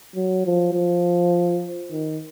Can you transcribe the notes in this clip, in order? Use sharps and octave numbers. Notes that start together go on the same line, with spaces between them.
F#3
F3
F3
D#3